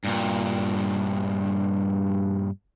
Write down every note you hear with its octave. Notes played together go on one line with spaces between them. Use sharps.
G2 A#2